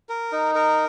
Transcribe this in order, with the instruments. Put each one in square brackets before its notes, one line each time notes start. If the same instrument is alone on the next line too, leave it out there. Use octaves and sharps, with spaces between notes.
[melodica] A#4
D#4
A#4